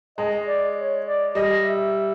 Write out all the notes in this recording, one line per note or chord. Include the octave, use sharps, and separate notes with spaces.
G#3 D#5
D5
C#5
D5
G3 D#5
E5